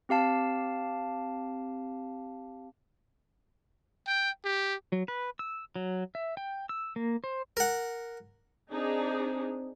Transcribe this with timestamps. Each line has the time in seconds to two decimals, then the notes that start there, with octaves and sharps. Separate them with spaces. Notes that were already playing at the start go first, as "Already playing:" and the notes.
0.09 C4 G4 F5 A5
4.07 G5
4.45 G4
4.92 F#3
5.08 B4
5.39 E6
5.76 F#3
6.15 E5
6.37 G5
6.69 E6
6.96 A#3
7.24 C5
7.57 A#4 F#5
8.72 C4 D4 D#4 G#4